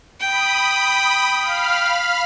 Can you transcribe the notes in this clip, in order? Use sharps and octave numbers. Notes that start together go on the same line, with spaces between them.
G5 B5 D#6
F5 B5 F6